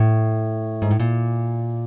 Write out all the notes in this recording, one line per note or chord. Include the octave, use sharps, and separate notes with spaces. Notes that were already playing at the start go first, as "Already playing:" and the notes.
Already playing: A2
G#2
A2
A#2